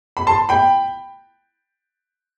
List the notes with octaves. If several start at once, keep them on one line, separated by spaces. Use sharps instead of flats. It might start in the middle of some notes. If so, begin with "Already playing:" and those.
B5
A5 C6
G5 B5